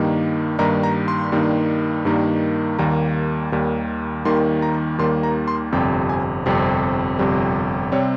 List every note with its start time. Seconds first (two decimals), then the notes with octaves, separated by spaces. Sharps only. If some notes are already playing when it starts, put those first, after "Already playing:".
Already playing: G2 D#3 G3 A#3 D#4
0.59 G2 D#3 G3 A#3 D#4 A#5
0.83 A#5
1.08 C6
1.32 G2 D#3 G3 A#3 D#4
2.05 G2 D#3 G3 A#3 D#4
2.79 D#2 D#3 G3 A#3 A#5
3.52 D#2 D#3 G3 A#3
4.25 D#2 D#3 G3 A#3 C6
4.62 A#5
4.98 D#2 D#3 G3 A#3 C6
5.23 A#5
5.48 C6
5.72 G1 F2 C3 G3 C4 G5
6.09 G#5
6.46 G1 F2 C3 G3 C4 G5
7.19 G1 F2 C3 G3 C4
7.92 C3 G3 C4 C#5